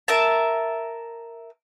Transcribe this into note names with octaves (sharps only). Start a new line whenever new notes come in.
A#4 E5 A5